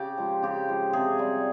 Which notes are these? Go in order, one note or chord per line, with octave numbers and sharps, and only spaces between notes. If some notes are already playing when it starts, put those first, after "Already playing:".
Already playing: C#3 G4
F3 G#3
C#3 G4
F3 G#3
C3 G#4
G3